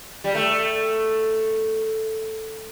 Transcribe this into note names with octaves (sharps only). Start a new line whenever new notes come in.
G3
A3